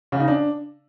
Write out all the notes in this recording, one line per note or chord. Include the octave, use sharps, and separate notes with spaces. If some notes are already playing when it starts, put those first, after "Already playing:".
C#3
D#4
D4